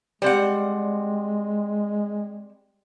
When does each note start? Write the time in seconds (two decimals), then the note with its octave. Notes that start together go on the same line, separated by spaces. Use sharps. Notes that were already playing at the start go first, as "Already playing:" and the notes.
0.22 G3 G#3 C4 G4 D5 D#5 F#5